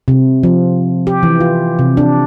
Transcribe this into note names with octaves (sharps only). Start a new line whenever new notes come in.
C3
F3
G4
E3
F4
C3
D4